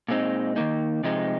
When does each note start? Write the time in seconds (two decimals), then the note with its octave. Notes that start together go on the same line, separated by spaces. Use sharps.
0.08 A#2 G#3 C4 D#4
0.56 D#3 A#3 D#4
1.03 C3 F3 G#3 D#4